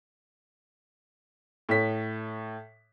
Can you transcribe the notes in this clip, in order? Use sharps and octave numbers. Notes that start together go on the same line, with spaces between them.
A2 C#5 B6